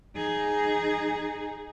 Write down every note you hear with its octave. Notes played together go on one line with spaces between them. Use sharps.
D#4 G#4